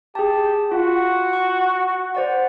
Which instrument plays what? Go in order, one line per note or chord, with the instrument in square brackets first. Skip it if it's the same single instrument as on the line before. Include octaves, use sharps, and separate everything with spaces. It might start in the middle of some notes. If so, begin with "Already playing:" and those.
[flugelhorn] G4 [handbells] G#4 A5
[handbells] F4 [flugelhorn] F#4
[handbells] C#6
C5 D5 F#5